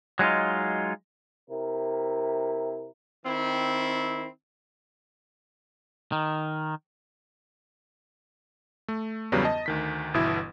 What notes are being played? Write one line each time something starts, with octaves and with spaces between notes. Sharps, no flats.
F#3 G#3 B3 D#4 F4
C3 E4 A#4
D#3 C4 E4
D#3
A3
E2 G2 C#3 F#3 G3 B3
D#5 A5
D2 D#3 B6
G1 B2 E3 E4